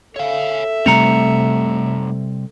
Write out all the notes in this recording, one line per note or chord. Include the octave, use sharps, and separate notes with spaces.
A4 C#5 E5 F5
C3 G3 A3 C4 D#4 A#5 C#7 F7